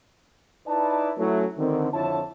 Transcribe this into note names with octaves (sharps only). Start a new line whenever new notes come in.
D#4 E4 B4 D5 A5
F#3 A3 C#4 E4
D3 D#3 C4
F2 D3 E4 C#5 A5